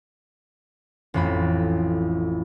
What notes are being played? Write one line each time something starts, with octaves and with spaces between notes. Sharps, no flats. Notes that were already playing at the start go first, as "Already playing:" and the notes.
A1 F2 B5